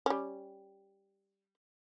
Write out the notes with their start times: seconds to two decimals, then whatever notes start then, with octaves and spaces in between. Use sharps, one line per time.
0.06 G3 C#4